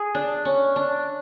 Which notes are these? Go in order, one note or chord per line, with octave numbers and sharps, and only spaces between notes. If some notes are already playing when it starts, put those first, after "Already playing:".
Already playing: G#4
D4
C#4
D4